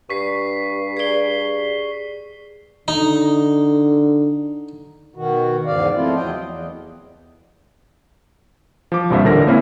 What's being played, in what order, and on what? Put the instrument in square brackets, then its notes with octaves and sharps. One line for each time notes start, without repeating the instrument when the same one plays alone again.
[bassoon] G2 [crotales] C#6 B6 C7
[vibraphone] G#4 D5 [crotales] C7 G7
[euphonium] D3 [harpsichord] D#4
[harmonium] B2 D#3 F#4
E2 G#2 C#3 D5 F5
F3 A3 C4 E4 F4
E2 F#3 D#5 G5
E2
[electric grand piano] F3 D6
C2 G2 A#2 F3 C5 E5
A1 D3 A#4 A#6
G#3 A#3 C4 C#4 E4 E5